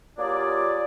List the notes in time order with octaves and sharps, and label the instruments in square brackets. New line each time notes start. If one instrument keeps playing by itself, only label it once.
[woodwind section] F#3 A#3 F4 G4 G#4 D5